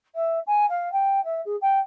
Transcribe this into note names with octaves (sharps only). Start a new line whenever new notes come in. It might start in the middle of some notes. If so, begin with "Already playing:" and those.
E5
G#5
F5
G5
E5
G#4
G5